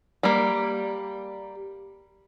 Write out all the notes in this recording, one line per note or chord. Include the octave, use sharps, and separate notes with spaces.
G3 A#3